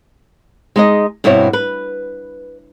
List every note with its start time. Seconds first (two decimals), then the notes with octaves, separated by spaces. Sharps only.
0.76 G#3 D#4 D#5
1.24 G2 B2 C4 E4 C#5
1.53 B4